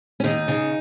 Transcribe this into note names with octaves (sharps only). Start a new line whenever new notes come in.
C#4
D#2 D#4
C#3